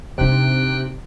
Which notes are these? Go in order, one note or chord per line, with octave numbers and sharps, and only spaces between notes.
C3 D4 D#4 G5 F#6